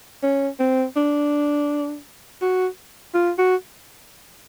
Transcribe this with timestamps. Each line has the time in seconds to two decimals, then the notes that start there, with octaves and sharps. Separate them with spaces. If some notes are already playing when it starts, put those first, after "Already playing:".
0.23 C#4
0.59 C4
0.96 D4
2.41 F#4
3.14 F4
3.38 F#4